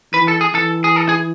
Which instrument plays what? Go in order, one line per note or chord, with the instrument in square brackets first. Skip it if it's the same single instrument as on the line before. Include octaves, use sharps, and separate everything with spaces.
[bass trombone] E3 [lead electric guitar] B4
[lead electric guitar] A4
G#4
[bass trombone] E3 [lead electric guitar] A4
[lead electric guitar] G#4
A4
G#4